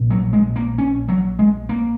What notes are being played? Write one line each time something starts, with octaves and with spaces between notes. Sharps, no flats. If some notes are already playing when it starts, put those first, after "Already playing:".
Already playing: A#1 A#2
F#3
G#3
A#3
C#4
F#3
G#3
A#3